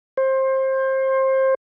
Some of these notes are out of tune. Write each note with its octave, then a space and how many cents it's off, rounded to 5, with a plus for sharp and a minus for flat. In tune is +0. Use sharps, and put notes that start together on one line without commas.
C5 +25